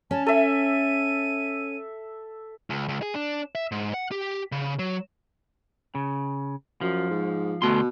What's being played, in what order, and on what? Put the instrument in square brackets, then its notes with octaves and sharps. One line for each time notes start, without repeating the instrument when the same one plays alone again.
[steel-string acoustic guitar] C#4 [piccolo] A5
[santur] A4 E5 [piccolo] D#7
[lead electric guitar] C#2
C#2
G#4
D4
E5
G#2
F#5
G4
C#3
F#3
[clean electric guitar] C#3
[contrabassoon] F#2 [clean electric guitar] F3
[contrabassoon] G#2
[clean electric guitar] D2 A3 C6 [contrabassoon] B2